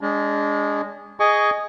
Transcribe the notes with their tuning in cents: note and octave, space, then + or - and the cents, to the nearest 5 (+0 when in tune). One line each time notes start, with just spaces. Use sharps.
G#3 -15 D4 -35
G#4 +0 D#5 +0 C#6 +25